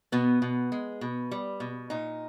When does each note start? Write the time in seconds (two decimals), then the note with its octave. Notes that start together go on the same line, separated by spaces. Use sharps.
0.12 B2 B3
0.42 B2
0.72 G#3
1.01 B2
1.31 G3
1.60 B2
1.90 A#2 D#4